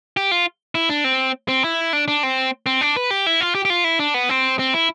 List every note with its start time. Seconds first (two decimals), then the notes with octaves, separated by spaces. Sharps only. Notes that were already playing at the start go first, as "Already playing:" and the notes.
0.17 G4
0.31 F4
0.75 E4
0.89 D4
1.04 C4
1.49 C4
1.64 E4
1.93 D4
2.08 D4
2.23 C4
2.66 C4
2.81 D4
2.97 B4
3.11 G4
3.26 E4
3.41 F4
3.55 G4
3.65 G4
3.70 F4
3.84 E4
3.99 D4
4.14 B3
4.29 C4
4.59 C4
4.74 E4